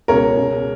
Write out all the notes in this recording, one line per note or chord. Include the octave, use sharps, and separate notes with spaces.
C#2 B2 G#3 A#4 C#5
C#2 B2 G#3